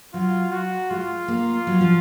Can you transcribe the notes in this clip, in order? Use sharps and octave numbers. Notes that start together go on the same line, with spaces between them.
F#3 F4
F#4
G#3 F4
A#3
F#3
F3